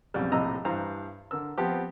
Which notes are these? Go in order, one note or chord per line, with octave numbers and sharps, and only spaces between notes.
B1 F2 C#3 G3
A#1 A2 C3 D#5 A#5 E6
G2 E3 C5 F5 A#5
D3 A#4 E6
F3 B3 C4 G4